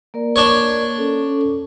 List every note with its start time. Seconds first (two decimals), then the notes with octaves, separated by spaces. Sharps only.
0.14 A#3 A#4 D5
0.36 D4 C#5
0.98 C#4 A4